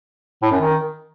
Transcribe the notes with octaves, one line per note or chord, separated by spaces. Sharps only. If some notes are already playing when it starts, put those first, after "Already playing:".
A2
F#2
D#3